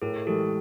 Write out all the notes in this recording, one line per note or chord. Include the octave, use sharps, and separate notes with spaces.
A2 G#4 A#4
E3 G#3 G4 A4